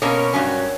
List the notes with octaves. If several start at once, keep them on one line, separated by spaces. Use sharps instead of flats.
B2 A#3 C#4 A#4 C#5
G2 F#3 C#4